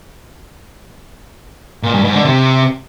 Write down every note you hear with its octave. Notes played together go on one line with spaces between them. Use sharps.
A#2
G2
G#2
D3
C3